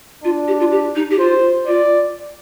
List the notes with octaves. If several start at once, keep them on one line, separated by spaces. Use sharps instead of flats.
D4 F4
G4
F4
G4
D#4
G4
F4 C5
F4 D5